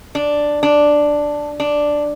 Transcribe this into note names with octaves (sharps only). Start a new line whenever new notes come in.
D4
D4
D4